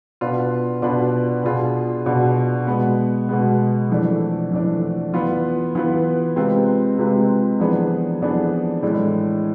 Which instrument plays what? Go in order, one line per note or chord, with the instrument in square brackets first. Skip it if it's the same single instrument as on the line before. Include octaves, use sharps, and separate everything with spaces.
[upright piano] B2 B3 D4 F4 B4
B2 B3 D4 F4 B4
B2 B3 D4 F4 G#4
B2 B3 D4 F4 G#4
B2 G#3 B3
B2 G#3 B3
F2 E3 A3 D4
F2 E3 A3 D4
E3 B3 F4 B4
E3 B3 F4 B4
C3 G#3 C4 F4 B4
C3 G#3 C4 F4 B4
F2 E3 B3 D4 G#4
F2 E3 B3 D4 G#4
A2 E3 G#3 D4